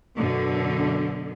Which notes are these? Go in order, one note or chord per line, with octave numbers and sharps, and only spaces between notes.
F#2 B2 D3